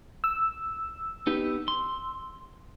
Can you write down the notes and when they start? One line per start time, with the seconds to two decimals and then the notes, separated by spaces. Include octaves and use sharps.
0.24 E6
1.27 B3 D#4 G4
1.68 C6